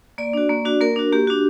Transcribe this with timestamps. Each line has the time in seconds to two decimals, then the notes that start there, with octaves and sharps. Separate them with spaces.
0.18 A#3 D5
0.33 D4 F#4
0.50 A#3
0.65 D4 F#4
0.81 A#3 A#4
0.96 D4 F#4
1.12 A#3 G4
1.27 D4 F#4